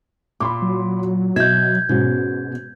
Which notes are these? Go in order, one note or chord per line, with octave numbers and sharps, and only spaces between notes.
A#2 B5 C6 D6
F#3
B2 F#4 D#5 E5 G6 G#6
G#2 B2 C#4 F#4